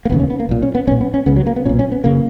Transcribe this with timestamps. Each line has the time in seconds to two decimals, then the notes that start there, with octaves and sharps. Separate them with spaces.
0.05 A#3
0.10 E1 D#2 C#3 B3
0.20 C#4
0.30 B3
0.40 A#3
0.49 B1 A#2
0.62 C#4
0.75 B3
0.87 B1 C#4
0.91 A#2
1.01 B3
1.14 C#4
1.26 C#2 C#3 B3
1.36 F#3
1.47 A#3
1.56 B3
1.65 B1 A#2 C#4
1.79 C#4
1.92 B3
2.04 F#1 C#3 A#3